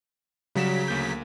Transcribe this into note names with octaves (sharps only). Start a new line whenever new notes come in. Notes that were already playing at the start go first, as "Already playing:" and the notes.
C#3 F#3 G3 F#4 B6 E7
D2 A#3 G6